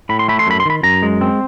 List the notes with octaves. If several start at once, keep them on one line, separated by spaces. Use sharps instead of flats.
A2 B5
C6
A3 B5
C6
F#2 B5
C6
D#3 B5
F#2 A#5
G#3
C4